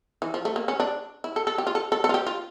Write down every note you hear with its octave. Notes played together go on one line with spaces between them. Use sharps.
E3
F3
A3
A#3
C#4
D4
E4
A4
A4
G4
F4
A4
A4
A4
F4
G4
F4